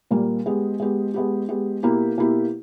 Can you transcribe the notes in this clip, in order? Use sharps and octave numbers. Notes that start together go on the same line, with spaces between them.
A#2 G3 A#3
G#3 B3 G4
G#3 B3 G4
G#3 B3 G4
G#3 B3 G4
B2 A#3 E4 G4
B2 A#3 E4 G4